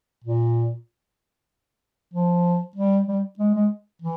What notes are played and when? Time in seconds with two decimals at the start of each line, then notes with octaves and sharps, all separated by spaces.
0.24 A#2
2.14 F3
2.76 G3
3.08 G3
3.39 G#3
3.55 G#3
4.02 E3